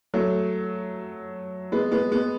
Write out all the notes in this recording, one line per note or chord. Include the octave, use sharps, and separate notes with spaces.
F#3 A3
G#3 B3
G#3 B3
G#3 B3